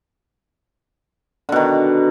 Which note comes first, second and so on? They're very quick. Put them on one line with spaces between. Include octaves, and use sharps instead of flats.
D3 B2 D#3